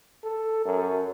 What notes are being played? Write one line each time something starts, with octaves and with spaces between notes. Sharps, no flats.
A4
F#2